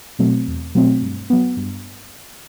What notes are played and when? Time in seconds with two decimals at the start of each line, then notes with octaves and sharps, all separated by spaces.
0.19 B2 F#3 A3 C4
0.47 E2
0.75 B2 F#3 A3 C4
1.02 G2
1.30 F#3 B3
1.57 G2